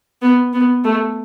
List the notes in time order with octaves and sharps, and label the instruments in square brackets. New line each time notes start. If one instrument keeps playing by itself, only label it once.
[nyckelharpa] B3
B3
A3